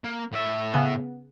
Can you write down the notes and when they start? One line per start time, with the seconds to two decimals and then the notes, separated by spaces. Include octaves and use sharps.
0.04 A#3
0.33 A2 E5
0.74 C#3 B3